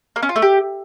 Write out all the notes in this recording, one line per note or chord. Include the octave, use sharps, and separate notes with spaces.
A#3
C#4
F4
A3
G4